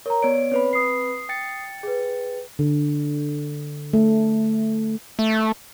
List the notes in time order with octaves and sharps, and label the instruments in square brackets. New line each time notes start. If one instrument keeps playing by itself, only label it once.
[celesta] A#4 A#5 [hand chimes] C#5
[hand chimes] B3 D5 D7 [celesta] C#5
[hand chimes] C4 B4 B5 [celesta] C#5
[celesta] D#6 C7
[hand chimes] G5 A6 C#7
[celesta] G#4 B4
[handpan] D3
A3
[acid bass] A3